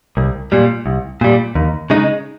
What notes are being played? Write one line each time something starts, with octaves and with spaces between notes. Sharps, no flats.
C2
A#2 G3
C2
A#2 G3
D#2
C#3 G#3 D#4